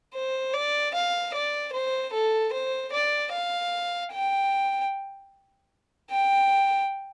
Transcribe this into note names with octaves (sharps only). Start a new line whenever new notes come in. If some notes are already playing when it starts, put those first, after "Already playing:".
C5
D5
F5
D5
C5
A4
C5
D5
F5
G5
G5